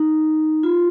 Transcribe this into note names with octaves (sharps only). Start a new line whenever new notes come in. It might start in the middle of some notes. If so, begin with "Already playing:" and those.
Already playing: D#4
F4